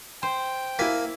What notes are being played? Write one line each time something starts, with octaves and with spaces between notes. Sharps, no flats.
C5 G5
A#3 E4 G#5 B6